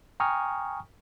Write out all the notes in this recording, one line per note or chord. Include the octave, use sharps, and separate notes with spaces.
G5 G#5 A#5 C#6 D#6 F6